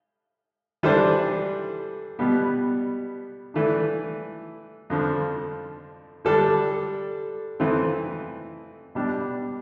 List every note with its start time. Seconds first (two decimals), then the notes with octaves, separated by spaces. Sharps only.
0.83 E3 G3 D4 A4 C5
2.19 B2 G3 B3
3.54 E3 A3 D4
4.90 F2 D3 F3
6.25 D3 G3 D4 A4
7.60 F2 E3 A3 C4
8.95 B2 G3 D4